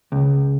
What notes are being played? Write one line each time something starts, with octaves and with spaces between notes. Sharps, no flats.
C#2